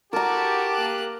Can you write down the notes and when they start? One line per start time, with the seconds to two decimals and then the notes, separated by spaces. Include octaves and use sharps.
0.13 E4 F#4 G4 A#4 A5 A#5 D6
0.74 A#3 F#6